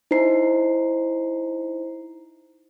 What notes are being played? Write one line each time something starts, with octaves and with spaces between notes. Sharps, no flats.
D#4 E4 C5 A#5 C7